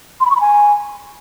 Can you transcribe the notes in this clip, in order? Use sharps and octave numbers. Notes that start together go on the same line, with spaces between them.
C6
B5
C#6
B5
G#5